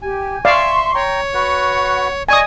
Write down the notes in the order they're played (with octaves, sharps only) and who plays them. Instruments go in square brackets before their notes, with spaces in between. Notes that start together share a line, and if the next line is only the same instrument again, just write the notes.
[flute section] G4 [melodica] G#5
[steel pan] D5 F5 [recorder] E5 [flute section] C6 C#6
[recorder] C#5 [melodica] G5 A#5
[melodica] F#4 B4 [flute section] F#5
[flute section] D5 D#5 [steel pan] G#5 D#6 [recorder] C#6